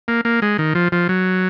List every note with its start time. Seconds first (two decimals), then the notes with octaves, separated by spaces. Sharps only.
0.08 A#3
0.25 A#3
0.42 G#3
0.58 D#3
0.75 F3
0.92 F3
1.09 F#3